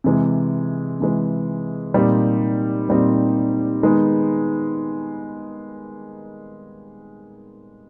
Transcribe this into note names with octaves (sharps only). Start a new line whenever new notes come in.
C3 E3 G#3
C3 E3 G#3
A#2 G3 C4 D#4
A#2 G3 C4 D#4
D#3 G#3 B3 D#4 G#4